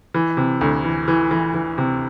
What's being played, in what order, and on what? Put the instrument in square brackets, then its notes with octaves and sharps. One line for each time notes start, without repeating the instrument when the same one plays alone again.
[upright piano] E3
C3
D2
E3
E3
E3
E3
C3